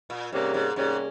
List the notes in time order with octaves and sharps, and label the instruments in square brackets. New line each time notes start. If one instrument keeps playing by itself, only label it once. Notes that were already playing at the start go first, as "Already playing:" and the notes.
[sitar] A#2
[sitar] G#2 [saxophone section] C3 G3 A#3 C#4
[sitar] G#2
[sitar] G#2 [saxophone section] C3 G3 A#3 C#4